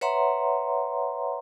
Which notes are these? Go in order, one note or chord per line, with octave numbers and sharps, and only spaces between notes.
B4 C#5 E5 F#5 A#5 C6